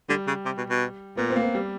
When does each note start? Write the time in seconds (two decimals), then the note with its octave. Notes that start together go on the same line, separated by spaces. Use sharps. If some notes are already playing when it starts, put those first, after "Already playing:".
0.09 D3 G3
0.27 C#3
0.45 C3
0.57 B2
0.70 B2
1.17 A#2 B3
1.30 C4
1.36 A#3
1.42 B3
1.55 G3